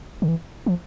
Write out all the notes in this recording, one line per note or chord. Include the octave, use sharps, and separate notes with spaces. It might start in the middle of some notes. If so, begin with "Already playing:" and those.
D3
E3
F3